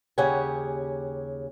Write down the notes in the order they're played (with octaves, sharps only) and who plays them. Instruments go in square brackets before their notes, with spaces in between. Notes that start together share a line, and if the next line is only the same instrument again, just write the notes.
[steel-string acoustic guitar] D#2 C#3 C#4 G4 F#5 G#5